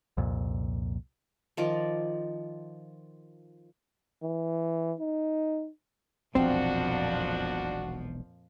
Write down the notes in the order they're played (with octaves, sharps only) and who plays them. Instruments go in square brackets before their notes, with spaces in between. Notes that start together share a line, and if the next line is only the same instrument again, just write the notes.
[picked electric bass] C2 F2 A#2
[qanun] D#3 F3 D5
[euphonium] E3
D#4
[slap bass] E1 B1 [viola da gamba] F2 A#2 F3 [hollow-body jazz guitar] C4 [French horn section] D4 F#4